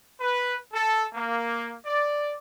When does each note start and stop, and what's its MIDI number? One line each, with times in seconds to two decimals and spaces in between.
0.21 0.56 71
0.73 1.04 69
1.14 1.75 58
1.86 2.36 74